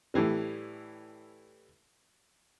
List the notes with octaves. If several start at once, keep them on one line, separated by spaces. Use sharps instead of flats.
A2 E3 G3